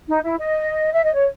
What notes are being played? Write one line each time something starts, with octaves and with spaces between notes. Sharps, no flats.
D#4
E4
D#5
E5
D#5
C#5